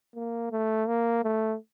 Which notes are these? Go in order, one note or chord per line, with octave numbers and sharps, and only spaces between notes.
A#3
A3
A#3
A3